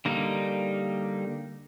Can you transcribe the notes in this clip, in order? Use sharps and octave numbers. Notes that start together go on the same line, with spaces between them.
D3 G3 A#3 D#4